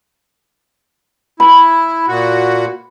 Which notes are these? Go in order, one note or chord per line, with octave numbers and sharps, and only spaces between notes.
E4 B5
A#2 F#4